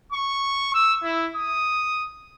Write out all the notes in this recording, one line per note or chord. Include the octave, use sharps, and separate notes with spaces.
C#6
E6
E4
D#6